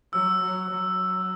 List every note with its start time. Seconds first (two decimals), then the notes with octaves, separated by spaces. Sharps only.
0.13 F#3 E6
0.42 F#3
0.70 F#3